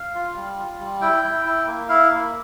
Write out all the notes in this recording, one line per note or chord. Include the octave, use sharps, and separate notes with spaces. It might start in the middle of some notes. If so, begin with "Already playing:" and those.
Already playing: F5
F4
G3
F4
G3
E4 G5
E4
E4
A#3
E4 F5
A#3